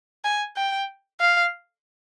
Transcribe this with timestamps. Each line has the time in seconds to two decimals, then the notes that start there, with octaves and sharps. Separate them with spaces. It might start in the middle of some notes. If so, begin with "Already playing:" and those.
0.24 G#5
0.57 G5
1.20 F5